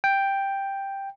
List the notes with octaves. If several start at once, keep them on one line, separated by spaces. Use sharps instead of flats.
G5